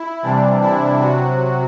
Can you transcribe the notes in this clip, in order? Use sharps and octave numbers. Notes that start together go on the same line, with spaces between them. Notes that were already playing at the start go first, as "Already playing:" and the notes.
Already playing: E4
C3 E3 G3 D4
E4
C3 F#3 F#4